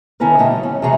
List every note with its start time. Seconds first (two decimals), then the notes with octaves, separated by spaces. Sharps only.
0.20 D3 D#3 C#4 E4 A#4 B4
0.38 A#2 A3 D#5 G5
0.50 F#3
0.63 C#4
0.82 E2 C3 G#3 F#4 G#4 A#5